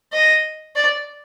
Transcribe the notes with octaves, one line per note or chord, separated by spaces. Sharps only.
D#5
D5